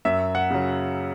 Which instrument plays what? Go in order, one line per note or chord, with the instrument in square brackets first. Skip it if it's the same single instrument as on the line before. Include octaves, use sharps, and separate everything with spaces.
[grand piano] F#2 E5
F#5
C#3 F#3